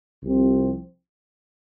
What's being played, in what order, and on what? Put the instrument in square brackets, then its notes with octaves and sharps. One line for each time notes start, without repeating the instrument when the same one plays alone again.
[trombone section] C2 C3 F3 C4